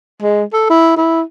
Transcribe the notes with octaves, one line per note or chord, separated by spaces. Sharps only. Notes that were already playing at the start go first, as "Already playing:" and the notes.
G#3
A4
E4
E4